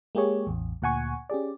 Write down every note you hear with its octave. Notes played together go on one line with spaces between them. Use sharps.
G#3 A#3 G4 G#4 C#5
A1 E2
D2 A#2 F#5 G#5 C#6
C#4 G4 G#4 D5